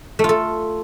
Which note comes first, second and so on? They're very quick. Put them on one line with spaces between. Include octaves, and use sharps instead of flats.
A3 F4 A4